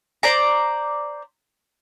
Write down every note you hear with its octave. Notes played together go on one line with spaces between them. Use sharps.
C5 D5 A#5